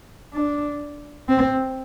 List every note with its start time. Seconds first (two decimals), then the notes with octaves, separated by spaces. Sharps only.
0.34 D4
1.29 C4